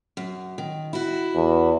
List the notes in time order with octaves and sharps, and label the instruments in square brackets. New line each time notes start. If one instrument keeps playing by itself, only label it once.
[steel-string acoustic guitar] F#2
D#3
E4 F#4
[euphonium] E2